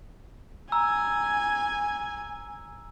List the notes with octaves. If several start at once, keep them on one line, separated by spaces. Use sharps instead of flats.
G#5 A#5 E6